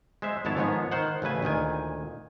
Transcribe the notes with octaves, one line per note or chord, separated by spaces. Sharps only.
G#3 C5 E5
G#1 F2 B3 E4 C#5 A5
G#2 D#3 F3 G#3 B3 C#5
D#3 C5 F#5
A1 C#3 A3 B4 G#5
D2 A#2 D#3 G#5